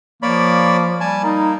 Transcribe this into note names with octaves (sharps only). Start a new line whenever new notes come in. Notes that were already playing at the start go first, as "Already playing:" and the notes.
F3 A#3 C#5 D5 B5
G3 G#5 A5
A#3 D#4